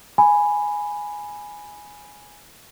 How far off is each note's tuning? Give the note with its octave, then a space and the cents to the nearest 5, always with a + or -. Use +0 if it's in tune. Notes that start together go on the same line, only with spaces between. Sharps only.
G#5 +0 B5 +0